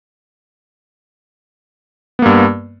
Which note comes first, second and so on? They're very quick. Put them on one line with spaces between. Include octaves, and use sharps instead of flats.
B3 A#3 G2